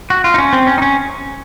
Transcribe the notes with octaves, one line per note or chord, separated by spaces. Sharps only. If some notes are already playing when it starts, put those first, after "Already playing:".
F#4
F4
D#4
C#4
C4
C#4
D#4
C#4